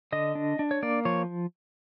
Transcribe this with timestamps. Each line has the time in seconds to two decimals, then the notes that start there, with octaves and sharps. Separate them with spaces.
0.12 D3 D#5
0.35 D4
0.59 D4
0.71 C#5
0.83 A#3 D5
1.05 F3 C#5